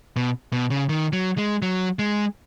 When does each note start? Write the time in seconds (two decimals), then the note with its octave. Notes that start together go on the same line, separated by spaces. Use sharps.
0.16 B2
0.52 B2
0.70 C#3
0.89 D#3
1.13 F#3
1.38 G#3
1.62 F#3
1.99 G#3